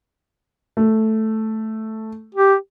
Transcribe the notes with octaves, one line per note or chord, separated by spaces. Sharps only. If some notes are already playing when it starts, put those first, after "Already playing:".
A3
G4